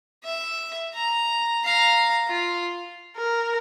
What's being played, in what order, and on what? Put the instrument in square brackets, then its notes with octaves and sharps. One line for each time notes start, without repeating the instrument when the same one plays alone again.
[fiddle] E5
A#5
F5 A#5
F4
[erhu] A#4